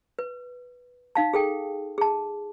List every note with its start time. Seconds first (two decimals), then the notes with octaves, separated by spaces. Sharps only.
0.19 B4
1.15 D#4 F5 A5
1.33 G#4 A4 G5
1.98 G#4 A5